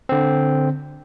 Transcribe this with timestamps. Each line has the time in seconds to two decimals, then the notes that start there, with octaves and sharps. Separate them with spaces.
0.09 D3 C4